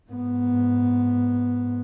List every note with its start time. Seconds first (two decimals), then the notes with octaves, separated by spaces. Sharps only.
0.11 G#2 B3